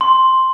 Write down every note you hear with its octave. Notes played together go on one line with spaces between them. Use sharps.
C6